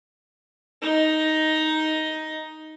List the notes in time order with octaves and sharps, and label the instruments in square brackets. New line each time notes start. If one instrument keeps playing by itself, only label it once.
[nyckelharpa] D#4 D#5